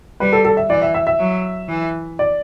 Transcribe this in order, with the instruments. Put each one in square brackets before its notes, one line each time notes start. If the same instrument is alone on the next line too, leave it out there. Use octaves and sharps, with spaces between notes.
[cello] G3 [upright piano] B4
[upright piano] A4
A4
E5
[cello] E3 [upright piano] D5
[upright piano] E5
E5
E5
[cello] F#3
E3
[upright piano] D5